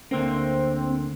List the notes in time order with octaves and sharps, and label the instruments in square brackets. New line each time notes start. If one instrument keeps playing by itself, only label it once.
[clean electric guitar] D2 D3 A#3 [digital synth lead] C4